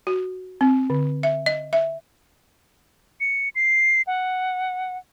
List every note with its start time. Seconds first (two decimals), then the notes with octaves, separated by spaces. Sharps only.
0.07 F#4
0.61 C4
0.90 D3
1.23 E5
1.46 D#5
1.73 E5
3.21 C#7
3.55 C7
4.07 F#5